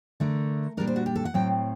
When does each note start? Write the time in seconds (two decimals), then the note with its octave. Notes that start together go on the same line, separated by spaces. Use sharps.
0.20 D3 A3 D4 A#4
0.77 A#2 G3 D4 A#4
0.87 C5
0.96 F#4
1.06 G4
1.16 A4
1.25 F#5
1.34 A2 F#3 C4 G5